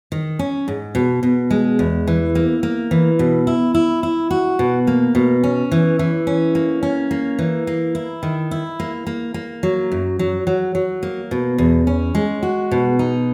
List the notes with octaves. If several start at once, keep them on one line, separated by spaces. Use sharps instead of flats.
D#3
C#4
G#2
B2
B2
G#3
E2
E3
A#3
A#3
E3
B2
E4
E4
E4
F#4
B2
A#3
B2
C#4
E3
E3
C#4
A#3
C#4
A#3
E3
A#3
E4
D#3
E4
A#3
A#3
A#3
F#3
F#2
F#3
F#3
F#3
A#3
B2
E2
C#4
G#3
F#4
B2
D#4